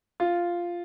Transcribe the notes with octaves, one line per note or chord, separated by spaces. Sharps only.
F4